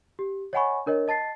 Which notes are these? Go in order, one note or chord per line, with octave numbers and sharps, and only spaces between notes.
G4
C#5 D#5 F#5 G#5 B5 C#6
D4 A#4 C#5 D#5
D#5 A5 A6 C7